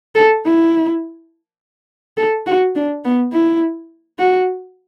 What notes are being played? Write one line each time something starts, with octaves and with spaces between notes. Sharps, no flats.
A4
E4
A4
F#4
D4
B3
E4
F#4